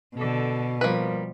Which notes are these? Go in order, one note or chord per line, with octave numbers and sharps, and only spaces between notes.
B2 D3 A4
F3 G3 A#3 B4